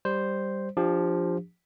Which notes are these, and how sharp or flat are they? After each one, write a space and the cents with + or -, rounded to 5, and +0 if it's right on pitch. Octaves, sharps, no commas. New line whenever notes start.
G3 +0 C5 +0
F3 +0 D4 +0 G4 +25